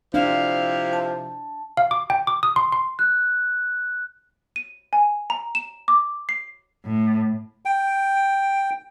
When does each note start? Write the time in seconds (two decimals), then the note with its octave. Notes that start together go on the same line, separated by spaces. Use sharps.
0.14 C3 F3 D4 E4 F5
0.93 A5
1.77 F5
1.91 D6
2.10 G5
2.27 D6
2.43 D#6
2.56 C6
2.72 C6
2.99 F#6
4.56 D#7
4.93 G#5
5.30 A#5
5.55 E7
5.88 D6
6.29 C7
6.86 A2
7.65 G5